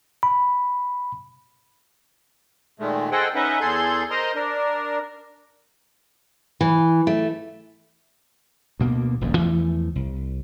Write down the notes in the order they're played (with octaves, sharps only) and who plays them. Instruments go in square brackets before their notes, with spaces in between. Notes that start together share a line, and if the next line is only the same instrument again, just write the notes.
[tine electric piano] B5
[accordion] A#2 D#3 G#3 A3
G#4 A4 C5 D#5 F#5 G5
C#4 D#4 B4 D#5 E5 F#5
E2 G#4 A4 C6 G6
A#4 C5 D#5 A#5 C6
D4 A#4
[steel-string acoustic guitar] E3
A3
[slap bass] D2 B2 A#3
D#1 A#1 F2
E2 E3 F3 A3
C2